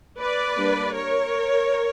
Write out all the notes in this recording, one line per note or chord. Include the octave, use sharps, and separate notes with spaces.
B4 D5
G3 A#3 D4
A#4 C#5